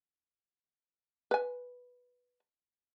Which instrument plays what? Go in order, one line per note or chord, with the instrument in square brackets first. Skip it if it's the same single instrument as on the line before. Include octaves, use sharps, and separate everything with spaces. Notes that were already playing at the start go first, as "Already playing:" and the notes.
[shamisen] B4 G#5